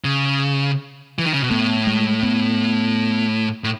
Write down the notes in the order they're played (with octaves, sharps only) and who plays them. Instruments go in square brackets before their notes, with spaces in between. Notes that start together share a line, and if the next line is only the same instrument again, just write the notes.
[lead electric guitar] C#3
E3
D#3
C#3
B2
[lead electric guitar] A2 [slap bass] B3
[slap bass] G#3
B3
[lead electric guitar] A2